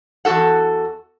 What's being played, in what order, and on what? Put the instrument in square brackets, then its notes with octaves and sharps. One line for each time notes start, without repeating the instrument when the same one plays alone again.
[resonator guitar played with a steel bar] E2 G2 F#4 A4 F#5